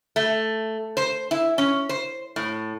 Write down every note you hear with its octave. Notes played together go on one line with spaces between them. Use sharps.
A3
C5
E4
C#4
C5
A2